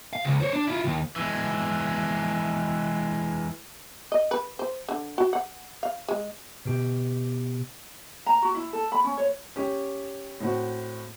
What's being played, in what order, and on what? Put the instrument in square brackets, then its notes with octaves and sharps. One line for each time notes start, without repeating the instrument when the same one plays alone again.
[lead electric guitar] F5
C#2
C5 C#5
D4
E4 F4
D#2
[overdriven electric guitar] E3 G#3
[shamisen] D#5
B4
C5
D3
F#4
F#5
F5
G#3
[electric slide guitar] B2 G4
[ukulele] A#5
F#4
E4
A4
B5
C#4
C#5
[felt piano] C#4 G4
A2 C4 F#4